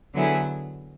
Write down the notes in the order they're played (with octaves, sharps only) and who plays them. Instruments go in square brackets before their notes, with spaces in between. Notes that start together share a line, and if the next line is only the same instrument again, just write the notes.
[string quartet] D3 F#3 B3 E4 G#4